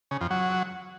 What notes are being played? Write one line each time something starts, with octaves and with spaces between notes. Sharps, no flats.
C#3
F2
F#3